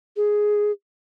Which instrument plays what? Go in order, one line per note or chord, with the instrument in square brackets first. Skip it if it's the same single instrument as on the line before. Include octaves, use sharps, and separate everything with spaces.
[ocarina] G#4